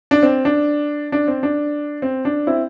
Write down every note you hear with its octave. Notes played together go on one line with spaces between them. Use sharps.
D4
C4
D4
D4
C4
D4
C4
D4
C4 E4